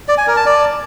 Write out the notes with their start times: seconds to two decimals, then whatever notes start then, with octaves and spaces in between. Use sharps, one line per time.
0.08 D5
0.18 G#5
0.27 A#4
0.37 A5
0.46 D5